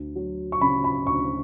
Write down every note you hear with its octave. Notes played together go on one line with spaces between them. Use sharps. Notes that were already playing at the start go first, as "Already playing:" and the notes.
Already playing: D2
F#3
C#6
C#3 B5
B5
D2 C#6